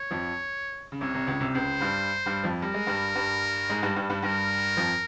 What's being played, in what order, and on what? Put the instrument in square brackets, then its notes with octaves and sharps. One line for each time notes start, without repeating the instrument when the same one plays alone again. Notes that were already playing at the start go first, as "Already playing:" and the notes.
Already playing: [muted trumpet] C#5
[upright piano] F2 F3
C#3
[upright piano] C2 C3 [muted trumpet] C#5
[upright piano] C2 C3
C#2 C#3
C2 C3
[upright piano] C#2 C#3 [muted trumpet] C5
[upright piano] G2 G3
G2 G3
F2 F3
[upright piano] G3 [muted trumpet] A#4
[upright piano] G#3
G2 G3
G2 G3
G#2 G#3
G2 G3
G2 G3
G2 G3
[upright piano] G2 G3 [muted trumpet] A#4
[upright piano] F2 F3